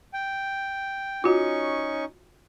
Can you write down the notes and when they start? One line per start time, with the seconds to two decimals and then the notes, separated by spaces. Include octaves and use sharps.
0.13 G5
1.24 C#4 D#4 F4 F#4 C#6